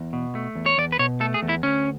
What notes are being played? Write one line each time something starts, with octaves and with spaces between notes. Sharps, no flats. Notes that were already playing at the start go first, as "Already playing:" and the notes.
Already playing: E2
B2
A3
E2
C#5
E2 D5
B4
B2 C#5
A3 A4
G#4
E2
E4
D2 C#4